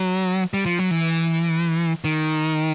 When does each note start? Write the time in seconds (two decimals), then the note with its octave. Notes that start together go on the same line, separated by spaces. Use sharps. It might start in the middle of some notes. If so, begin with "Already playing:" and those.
Already playing: F#3
0.54 G3
0.66 F3
0.79 F#3
0.91 E3
2.04 D#3